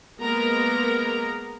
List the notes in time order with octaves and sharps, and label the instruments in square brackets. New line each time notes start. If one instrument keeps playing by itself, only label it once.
[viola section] G#3 A#3 B3 A#4 A#5